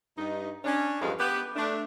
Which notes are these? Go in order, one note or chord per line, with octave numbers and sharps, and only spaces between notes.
G2 D#4
C#4 D4
E2 G2 F3 G#3 A4 F5
B3 G4 B4
A3 D4